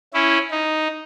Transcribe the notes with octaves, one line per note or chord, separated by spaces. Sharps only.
C#4 E4
D#4